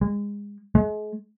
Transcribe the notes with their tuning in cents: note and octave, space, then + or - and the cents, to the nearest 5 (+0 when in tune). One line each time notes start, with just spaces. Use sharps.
G#3 -25
G#3 +35